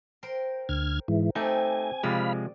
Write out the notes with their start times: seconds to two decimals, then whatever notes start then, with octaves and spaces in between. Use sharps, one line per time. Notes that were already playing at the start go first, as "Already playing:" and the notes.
0.23 A#4 C5 G5
0.69 D2 F6 G#6
1.08 G#2 E3
1.35 A3 C4 D#4 G4 G#5
2.04 C3 F3 G#3 D5 F5 B5